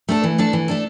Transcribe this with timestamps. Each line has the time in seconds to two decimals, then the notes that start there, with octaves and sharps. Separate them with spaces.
0.09 A3 D4 A4
0.24 E3
0.38 A3 D4 A4
0.53 E3
0.68 A3 D4 A4